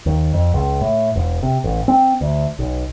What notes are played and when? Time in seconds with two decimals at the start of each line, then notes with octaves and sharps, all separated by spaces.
0.06 D#2
0.34 F2
0.54 C#2
0.81 A2
1.15 E1
1.43 C3
1.64 A1
1.88 C4
2.21 D2
2.59 B1